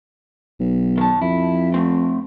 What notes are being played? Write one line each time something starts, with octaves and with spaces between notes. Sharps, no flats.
B1
D#3 A5
F2 E4
A3 C4